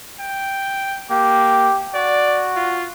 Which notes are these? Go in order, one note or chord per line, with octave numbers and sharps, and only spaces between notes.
G5
A#3 G4
F#4 D5
F4